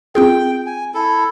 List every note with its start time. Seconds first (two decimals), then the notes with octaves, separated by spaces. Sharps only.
0.15 C4 F4 G#4 G5
0.66 G#5
0.94 E4 A4